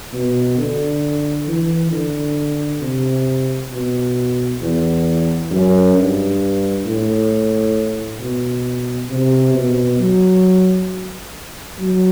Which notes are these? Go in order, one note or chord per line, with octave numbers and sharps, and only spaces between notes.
B2
D3
E3
D3
C3
B2
E2
F#2
G2
A2
B2
C3
B2
F#3
F#3